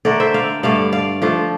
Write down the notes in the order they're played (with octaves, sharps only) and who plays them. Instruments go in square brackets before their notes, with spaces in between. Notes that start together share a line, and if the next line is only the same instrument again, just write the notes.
[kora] D3 A3 D4 A#4 D5
C5 E5
D5 F5
G2 D3 A3 D5 F5
D5 F5
F3 A3 D4 F4